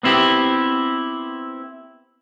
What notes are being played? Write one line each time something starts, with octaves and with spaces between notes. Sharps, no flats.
B3 C4 E4 G4